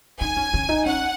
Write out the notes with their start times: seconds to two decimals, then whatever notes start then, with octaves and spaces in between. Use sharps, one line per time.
0.21 D#4 G#5
0.37 C#4
0.54 C#4
0.69 D#4
0.86 C#4 F#5